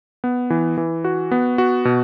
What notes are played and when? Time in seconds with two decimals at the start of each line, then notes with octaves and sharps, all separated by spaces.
0.24 B3
0.50 E3
0.77 E3
1.04 F#4
1.31 B3
1.58 F#4
1.85 B2